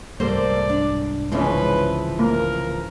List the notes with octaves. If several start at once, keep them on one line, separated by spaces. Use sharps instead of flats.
C2 G#2 G3 A#3 A4 C5 D5
D4
C#3 E3 F3 G#3 C#4 B4
A#3 A#4